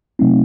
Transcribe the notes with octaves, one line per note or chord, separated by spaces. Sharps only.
C3 F#3 A3 C4 D#4